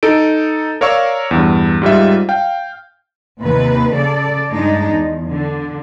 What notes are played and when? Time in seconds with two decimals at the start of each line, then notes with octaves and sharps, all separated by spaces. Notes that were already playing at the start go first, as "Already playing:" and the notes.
0.03 D#4 A4 D7
0.81 A#4 C#5 D5 F5 C#6 E6
1.31 E2 G2
1.82 G#2 G3 F4 E5
2.29 F5 G5
3.40 D#2 C3 B4
3.92 C#3 A4 D5
4.49 G2 G#3 D4 D#4
4.91 E2
5.30 D3